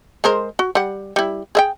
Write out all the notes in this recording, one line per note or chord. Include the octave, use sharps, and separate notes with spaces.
G#3 A#4 C5
F#4
G3 F#5
G3 E4
G#4 E5 G5